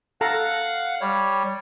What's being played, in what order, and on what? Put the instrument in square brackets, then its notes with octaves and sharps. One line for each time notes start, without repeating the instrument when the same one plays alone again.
[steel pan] A4 A5 A#5 [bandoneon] F5 F#5 F#6
[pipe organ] G3 [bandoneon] C#5